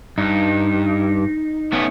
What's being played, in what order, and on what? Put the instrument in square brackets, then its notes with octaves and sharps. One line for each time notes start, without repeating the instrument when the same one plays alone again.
[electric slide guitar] G2 [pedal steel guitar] D#4
[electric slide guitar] A3 B3 C#4